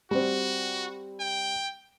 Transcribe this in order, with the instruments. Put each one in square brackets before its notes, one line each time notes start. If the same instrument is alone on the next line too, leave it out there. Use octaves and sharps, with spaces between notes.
[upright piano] G3 C4 [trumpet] F#4
[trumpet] G5